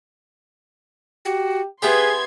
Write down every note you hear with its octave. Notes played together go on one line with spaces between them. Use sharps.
F#4 G4
B3 E4 G4 G#4 B4 C6 G#6